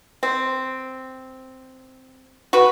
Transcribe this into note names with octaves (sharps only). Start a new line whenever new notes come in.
C4
F#4 B4